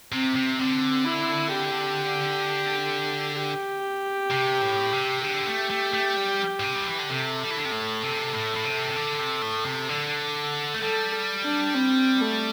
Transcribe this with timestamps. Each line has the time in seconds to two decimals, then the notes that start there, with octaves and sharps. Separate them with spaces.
0.12 C3 C4
0.35 C3
0.59 D3 C4
1.05 E4
1.52 G4
3.37 G4
4.31 C3
4.61 A2
4.93 C3
5.24 D3 G4
5.47 A3
5.70 A3
5.93 A3
6.17 G3
6.60 A2
6.63 C3
6.75 G3
6.87 E3
6.98 D3
7.10 C3 A4
7.43 G3
7.50 E3
7.58 D3
7.65 C3
7.72 A2
8.02 C3
8.34 A2
8.55 A2
8.65 C3
8.90 C3
8.96 D3
9.19 C3
9.42 A2
9.65 C3
9.89 D3
10.74 A3
10.81 G3 A4
11.44 D4
11.75 C4
12.21 A3